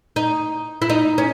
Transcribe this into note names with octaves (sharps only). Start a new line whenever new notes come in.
D#4
E4
D#4
C#4